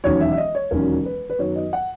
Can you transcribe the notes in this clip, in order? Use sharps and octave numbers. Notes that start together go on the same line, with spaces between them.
E1 D#2 D#3 F#3 C#4 C#5
E5
E5
D#5
C#5
E1 D#2 D#3 F#3 C#4 A#4
B4
B4
F#2 D#3 F#3 B3 C#5
D#5
F#5